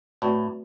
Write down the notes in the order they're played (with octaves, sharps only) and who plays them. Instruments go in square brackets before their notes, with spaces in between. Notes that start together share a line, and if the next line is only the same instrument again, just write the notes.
[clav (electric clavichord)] A2 [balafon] A3 C4 F#4 B4 D5